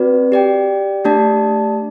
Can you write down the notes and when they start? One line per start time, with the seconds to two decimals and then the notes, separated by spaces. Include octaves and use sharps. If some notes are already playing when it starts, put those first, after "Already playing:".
Already playing: C4 F#4 B4 D5
0.32 G4 D5 G5
1.05 A3 D4 G4 D5 A5